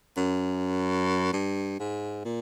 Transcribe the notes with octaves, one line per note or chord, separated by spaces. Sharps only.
F#2
G2
G#2
A#2